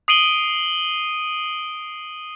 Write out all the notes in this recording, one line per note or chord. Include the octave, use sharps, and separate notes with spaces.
D#6 C7 D7 D#7 F#7 G7